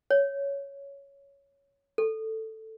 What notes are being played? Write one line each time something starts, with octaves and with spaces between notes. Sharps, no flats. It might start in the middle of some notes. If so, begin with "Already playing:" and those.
C#5
A4